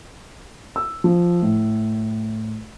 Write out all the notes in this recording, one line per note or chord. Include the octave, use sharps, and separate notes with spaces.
E6
F3
A2